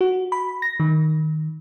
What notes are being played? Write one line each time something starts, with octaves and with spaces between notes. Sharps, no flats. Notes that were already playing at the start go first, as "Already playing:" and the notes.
F#4
B5
A#6
D#3